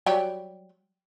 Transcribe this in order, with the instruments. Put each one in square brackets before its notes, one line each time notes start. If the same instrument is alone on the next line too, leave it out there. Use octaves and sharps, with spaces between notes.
[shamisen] F#3 G3 G4